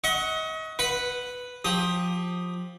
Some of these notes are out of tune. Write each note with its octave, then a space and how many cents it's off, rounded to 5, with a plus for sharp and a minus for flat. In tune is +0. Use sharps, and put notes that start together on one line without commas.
D#5 +35 F#5 +0 C#6 +0
B4 +0 F#5 +0 B5 +0
F3 +25 G4 +10 D#6 +0